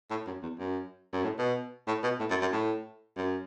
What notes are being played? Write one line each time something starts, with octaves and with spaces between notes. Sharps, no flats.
A2
F#2
E2
F#2
F#2
A2
B2
A2
B2
A2
F#2
F#2
A2
F#2